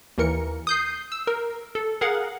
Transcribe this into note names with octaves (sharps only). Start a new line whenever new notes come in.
D#2 E3 A#4 C#7
D#6 G6 C7
E6
A#4
A4
G#4 A#4 F5 F#5